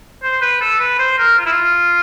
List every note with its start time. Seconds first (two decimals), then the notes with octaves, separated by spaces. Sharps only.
0.23 C5
0.41 B4
0.61 A4
0.80 B4
0.99 C5
1.18 A#4
1.38 F4
1.46 E4
1.53 F4